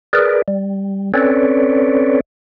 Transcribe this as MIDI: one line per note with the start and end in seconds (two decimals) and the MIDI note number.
0.13 0.42 68
0.13 0.42 70
0.13 0.42 71
0.13 0.42 74
0.48 1.12 55
1.14 2.20 60
1.14 2.20 61
1.14 2.20 69
1.14 2.20 71
1.14 2.20 73
1.14 2.20 74